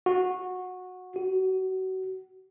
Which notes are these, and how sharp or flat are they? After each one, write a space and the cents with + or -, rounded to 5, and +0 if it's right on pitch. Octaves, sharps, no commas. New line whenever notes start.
F#4 -15
F#4 +30